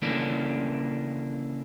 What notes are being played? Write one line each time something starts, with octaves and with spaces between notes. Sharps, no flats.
C#3 E3 A3 A#3 C#4 D4